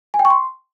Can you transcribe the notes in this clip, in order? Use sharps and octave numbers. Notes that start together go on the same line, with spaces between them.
G#5
G5
C#6
C6